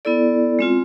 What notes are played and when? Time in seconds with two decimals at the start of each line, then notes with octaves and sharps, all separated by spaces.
0.05 B3 E4 A4 D5
0.59 G#3 C4 F4